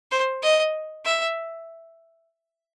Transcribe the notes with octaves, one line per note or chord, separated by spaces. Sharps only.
C5
D#5
E5